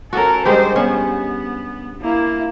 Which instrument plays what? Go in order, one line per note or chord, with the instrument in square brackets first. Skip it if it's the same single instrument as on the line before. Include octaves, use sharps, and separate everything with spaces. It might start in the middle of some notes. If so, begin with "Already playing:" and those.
[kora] C#4 F#4 [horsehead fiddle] A4 A#4
[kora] G2 G#3 G4 [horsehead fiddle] C5 D#5
[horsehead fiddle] B3 [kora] C#4
[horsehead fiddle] A#3 E4